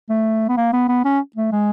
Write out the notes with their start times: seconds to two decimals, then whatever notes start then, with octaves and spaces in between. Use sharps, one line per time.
0.10 A3
0.49 B3
0.57 A#3
0.73 B3
0.89 B3
1.05 C#4
1.36 A3
1.52 G#3